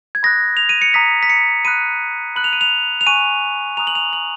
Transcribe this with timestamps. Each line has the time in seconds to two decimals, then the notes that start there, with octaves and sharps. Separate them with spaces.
0.15 G#6
0.23 B5 D#6 F#6 A#6
0.57 F7
0.69 D#7
0.82 C#7
0.94 A#5 D#6 F#6 B6
1.23 B6
1.30 C#7
1.65 B5 D#6 F#6 D#7
2.36 B5 F#6 F#7
2.44 F7
2.53 D#7
2.61 F7
3.01 F7
3.07 G#5 C#6 F#6 D#7
3.77 A#5 D#6 F#6 F7
3.87 F#7
3.95 F7
4.13 F#7